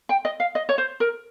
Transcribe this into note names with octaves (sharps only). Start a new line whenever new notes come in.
G5
D#5
F5
D#5
C#5
C5
A#4